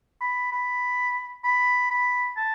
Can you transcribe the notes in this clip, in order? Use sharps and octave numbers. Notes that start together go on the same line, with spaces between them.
B5
B5
B5
B5
A5